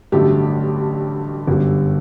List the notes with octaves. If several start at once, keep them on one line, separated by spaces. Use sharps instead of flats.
A1 G2 D3 F#3 A3 G4
G1 F#2 D3 G3